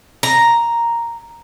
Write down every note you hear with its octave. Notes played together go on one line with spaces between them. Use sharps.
A#5